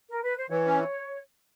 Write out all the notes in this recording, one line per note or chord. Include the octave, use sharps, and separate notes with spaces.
A#4
B4
C5
E3 C#5
C#4